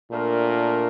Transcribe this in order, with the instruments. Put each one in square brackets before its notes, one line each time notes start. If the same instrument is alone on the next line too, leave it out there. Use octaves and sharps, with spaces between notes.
[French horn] A#2 [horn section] A3 D4 F4 A#4